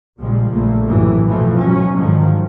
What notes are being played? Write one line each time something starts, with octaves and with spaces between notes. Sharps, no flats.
A#1 A#2 C#3 F3 G3 G#3
A#1 A3 A#3
F#2 A2 C3 E3
B2 E3 F3 A3
G#2 F#3 C#4
G#2 D3 D#3 F3 F#3